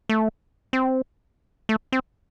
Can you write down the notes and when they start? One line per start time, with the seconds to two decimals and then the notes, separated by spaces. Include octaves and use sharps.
0.09 A3
0.73 C4
1.69 A3
1.92 C4